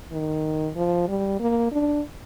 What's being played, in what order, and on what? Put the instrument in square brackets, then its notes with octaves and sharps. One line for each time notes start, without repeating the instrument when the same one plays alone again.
[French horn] D#3
F3
G3
A#3
D4